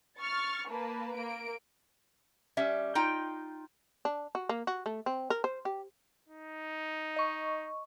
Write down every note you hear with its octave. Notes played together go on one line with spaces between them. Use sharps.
C#6 F6 A6
A#3 B4 A5
A#3 D7
G3 C#4 E5
D#4 F4 G5
D4
F#4
A#3
F#4
A3
C4
A#4
C5
G4
D#4
D#5 C#6